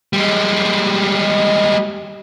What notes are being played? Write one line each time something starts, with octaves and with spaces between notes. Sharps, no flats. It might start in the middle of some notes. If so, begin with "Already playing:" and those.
G3 G#3